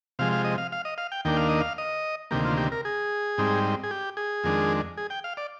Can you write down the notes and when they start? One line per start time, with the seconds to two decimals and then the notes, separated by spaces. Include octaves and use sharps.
0.19 C3 F3 G#3 F5
0.32 F5
0.45 D#5
0.58 F5
0.72 F5
0.85 D#5
0.98 F5
1.12 G5
1.25 D#2 D#3 A#3 D4 G5
1.37 F5
1.49 D#5
1.61 F5
1.78 D#5
2.31 D2 C3 D#3 A#3 G4
2.45 F4
2.58 G4
2.72 A#4
2.85 G#4
3.38 G#2 G3 C4 D#4
3.83 G#4
3.91 G4
4.17 G#4
4.44 F2 D#3 G#3 D4
4.97 G#4
5.10 G5
5.24 F5
5.37 D5